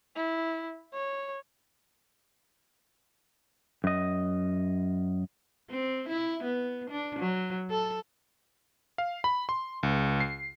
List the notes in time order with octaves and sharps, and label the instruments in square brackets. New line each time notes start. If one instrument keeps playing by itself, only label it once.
[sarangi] E4
C#5
[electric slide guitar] F#2 D#5
[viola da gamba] C4
E4
B3
D4
F#3
A4
[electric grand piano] F5
B5
C6
C#2
C7